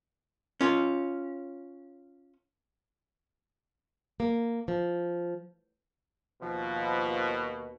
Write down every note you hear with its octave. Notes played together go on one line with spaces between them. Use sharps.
C#4 F4
A#3
F3
D#2 B2 F3